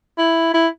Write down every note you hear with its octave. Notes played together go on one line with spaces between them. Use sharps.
E4
E4